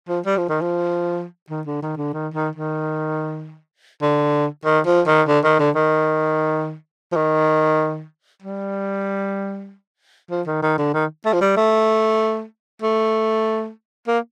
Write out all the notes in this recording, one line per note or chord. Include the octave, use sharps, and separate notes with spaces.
F3
G3
F3
D#3
F3
D#3
D3
D#3
D3
D#3
D#3
D#3
D3
D#3
F3
D#3
D3
D#3
D3
D#3
F3
D#3
G3
F3
D#3
D#3
D3
D#3
A3
F3
G3
A3
A3
A#3